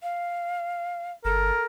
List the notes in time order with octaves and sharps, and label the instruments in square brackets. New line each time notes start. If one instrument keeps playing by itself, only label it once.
[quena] F5
[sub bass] G1 [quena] A4 [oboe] A#4